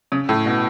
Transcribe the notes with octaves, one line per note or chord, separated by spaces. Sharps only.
C#3
A2
B2